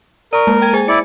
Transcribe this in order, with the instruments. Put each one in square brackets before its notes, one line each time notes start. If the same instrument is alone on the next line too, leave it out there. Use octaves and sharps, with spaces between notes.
[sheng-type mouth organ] A#4 [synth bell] D5 C#6
[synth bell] G#3 A#3
G5 G#6 D#7
G#4 C5 G#5
[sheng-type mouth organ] E4 D5 [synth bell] C#7